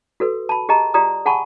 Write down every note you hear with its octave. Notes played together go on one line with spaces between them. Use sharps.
F#4 A4 B4
A5 B5
G4 G#4 D#5 A5 A#5
F4 G4 D5 A#5 D#6
G#4 F#5 G#5 A5 B5 C#6